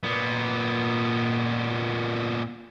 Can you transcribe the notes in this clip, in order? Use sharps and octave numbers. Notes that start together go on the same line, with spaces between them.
A#2 B3